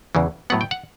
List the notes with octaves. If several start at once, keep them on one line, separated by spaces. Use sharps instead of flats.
E2 C#3 E3
A2 F#3 B3 F#5
G5
F#5